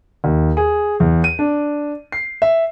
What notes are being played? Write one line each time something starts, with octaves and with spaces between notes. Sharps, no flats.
D#2
G#4
E2
D#7
D4
C7
E5